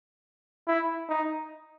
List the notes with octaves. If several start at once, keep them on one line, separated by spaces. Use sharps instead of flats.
E4
D#4